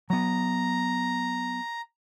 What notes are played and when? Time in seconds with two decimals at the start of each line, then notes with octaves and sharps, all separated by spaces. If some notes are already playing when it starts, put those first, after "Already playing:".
0.10 F#3 B3 A#5